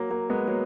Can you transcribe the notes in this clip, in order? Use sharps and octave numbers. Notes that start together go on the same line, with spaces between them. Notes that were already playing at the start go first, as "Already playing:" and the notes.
Already playing: F#3 A#3
F#3 A#3
G#3 B3
F#3 A#3